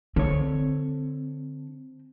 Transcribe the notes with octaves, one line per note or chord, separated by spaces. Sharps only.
D3 C4 C#5